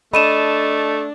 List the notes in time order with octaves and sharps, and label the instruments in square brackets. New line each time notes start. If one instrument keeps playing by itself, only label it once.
[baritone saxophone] A3 [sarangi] D4 [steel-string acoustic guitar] D#5 [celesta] B5 D#7 E7